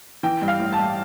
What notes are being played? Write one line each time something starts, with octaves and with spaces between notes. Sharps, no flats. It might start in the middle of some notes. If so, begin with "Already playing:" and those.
E3 G5
G2
F5
A1
A5
G2